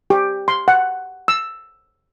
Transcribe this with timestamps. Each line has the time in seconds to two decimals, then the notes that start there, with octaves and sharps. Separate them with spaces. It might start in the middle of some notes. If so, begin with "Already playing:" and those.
0.10 G4
0.48 C6
0.68 F#5
1.28 E6